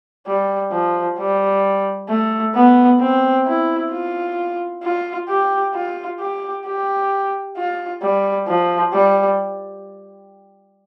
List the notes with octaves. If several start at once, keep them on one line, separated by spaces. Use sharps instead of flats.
G3
F3
G3
A3
B3
C4
E4
F4
F4
G4
F4
G4
G4
F4
G3
F3
G3